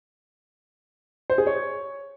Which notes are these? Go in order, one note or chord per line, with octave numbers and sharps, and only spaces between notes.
C5
G#4
C#5